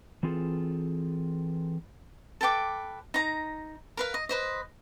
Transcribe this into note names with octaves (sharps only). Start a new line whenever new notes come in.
E3 C4 F4 G#4 A4
A4 B4 G5 D6
D#4 A#5
A#4 B4 F5
D#5
B4 C5 D#5